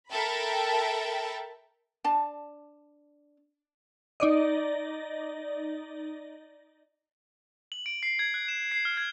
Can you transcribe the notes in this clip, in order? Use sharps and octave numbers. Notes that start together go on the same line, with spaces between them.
A4 A#4 E5 G5 A5 B5
D4 A5
D#4 D5 D#5
F#7
D7
C7
G#6
F#6
E7
C7
F6
G#6